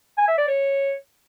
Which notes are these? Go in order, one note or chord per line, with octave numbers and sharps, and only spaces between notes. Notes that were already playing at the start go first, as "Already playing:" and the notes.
G#5
E5
D5
C#5